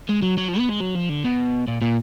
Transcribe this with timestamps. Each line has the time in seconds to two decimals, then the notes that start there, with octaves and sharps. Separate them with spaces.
0.09 G#3
0.22 F#3
0.38 F#3
0.49 F3
0.59 B3
0.70 G#3
0.81 F#3
0.95 F3
1.09 D3
1.24 B2
1.67 A#2
1.82 A#2